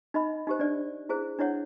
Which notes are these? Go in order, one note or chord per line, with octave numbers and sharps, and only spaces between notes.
D#4 D#5 B5
D#4 G4 C5
D4 D5
E4 G#4 C5
D4 E4 C#5 F#5